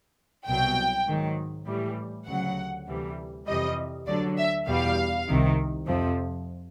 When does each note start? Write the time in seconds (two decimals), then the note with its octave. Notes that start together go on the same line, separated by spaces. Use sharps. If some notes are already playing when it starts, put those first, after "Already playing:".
0.46 C2 B2 F#3 G5
1.07 G#2 D#3 F#3
1.67 A2 E3 G3
2.26 D2 C#3 F#3 F#5
2.87 D2 C3 E3 G3
3.47 F2 C3 E3 G3 D#5
4.06 D2 D3 F#3 D5
4.37 E5
4.67 E2 B2 G3 F5
5.27 C2 C3 D#3
5.87 F2 C3 F3